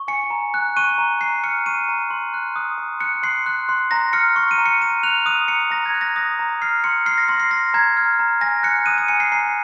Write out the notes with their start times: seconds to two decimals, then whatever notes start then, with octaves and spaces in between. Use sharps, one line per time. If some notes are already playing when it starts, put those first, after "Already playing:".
Already playing: C#6
0.08 G#5 C#7
0.31 A#5
0.54 F#6
0.77 C#6 D#7
0.98 A#5
1.21 A#5 C7
1.44 F6 C#7
1.66 C#6 D#7
1.89 A#5
2.10 C6
2.34 F#6
2.56 D#6
2.78 C6
3.00 F#6 C#7
3.23 C6 C7
3.46 F#6
3.69 C6
3.91 A#5 A#6
4.13 F6 C#7
4.36 C#6 C#7
4.51 D#7
4.58 A#5
4.66 C#7
4.81 A#5 D#7
5.03 F#6 F7
5.26 D#6 D#7
5.48 A#5 C#7
5.71 A#5 A#6
5.86 G#6
5.94 F#6
6.01 A#6
6.16 D#6 A#6
6.39 A#5
6.62 F6 C7
6.84 C6 C#7
7.06 F6 C7
7.18 A#6
7.28 C6 A#6
7.40 C7
7.51 F6 A#6
7.74 A#5 G#6
7.97 F6
8.19 A#5
8.41 G#5 A#6
8.63 F#6 C#7
8.86 D#6 D#7
8.98 D#7
9.08 G#5 C#7
9.20 C7
9.32 A#5 C7